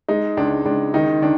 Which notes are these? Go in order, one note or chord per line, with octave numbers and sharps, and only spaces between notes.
G#3 D#4
C#2 D4
C#2 D4
D#3 D#4
D#3 D4